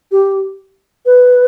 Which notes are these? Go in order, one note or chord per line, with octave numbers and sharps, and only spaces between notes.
G4
B4